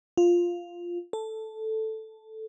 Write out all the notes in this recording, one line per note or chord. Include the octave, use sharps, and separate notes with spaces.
F4
A4